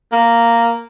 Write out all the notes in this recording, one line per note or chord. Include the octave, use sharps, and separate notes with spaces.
A#3